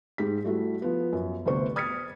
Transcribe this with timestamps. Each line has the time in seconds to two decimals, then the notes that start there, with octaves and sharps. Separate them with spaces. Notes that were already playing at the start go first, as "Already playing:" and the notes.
0.18 G#2 G4 B6
0.44 G3 A3 E4 F#4
0.82 F3 B3
1.13 F#2
1.46 G1 D2 C3 B3 C5 C#6
1.76 D#6 F6 G#6 A6 B6 C#7